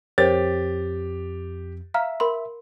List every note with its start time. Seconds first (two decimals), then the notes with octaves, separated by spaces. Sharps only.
0.18 F2 G4 A#4 C5 C#5 A6
1.94 E5 F5 A#5 F6
2.20 A#4 B5 C6